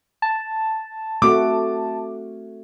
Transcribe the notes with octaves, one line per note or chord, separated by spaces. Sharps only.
A5
A3 C4 F#4 D6